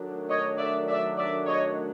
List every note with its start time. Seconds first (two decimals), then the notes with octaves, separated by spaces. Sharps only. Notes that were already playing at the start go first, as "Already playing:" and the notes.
Already playing: D#3 F#3 A3 D4
0.29 C#5 D#5
0.59 D5 E5
0.88 D5 E5
1.17 D5 E5
1.46 C#5 D#5